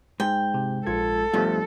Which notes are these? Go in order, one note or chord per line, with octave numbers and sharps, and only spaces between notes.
G#2 G5
C3
A#1 F4 A4 G#6
G2 B2 F3 A3 F4